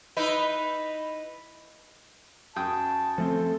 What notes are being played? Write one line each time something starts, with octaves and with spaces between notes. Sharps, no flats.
D#4 E4 B4
F#2 G5 A5 D#6
F3 A3 C4 A4